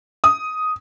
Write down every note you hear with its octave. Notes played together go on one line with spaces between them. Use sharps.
D#6